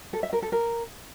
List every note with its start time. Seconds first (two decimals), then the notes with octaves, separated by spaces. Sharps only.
0.13 A4
0.23 E5
0.33 A#4
0.42 A4
0.52 A#4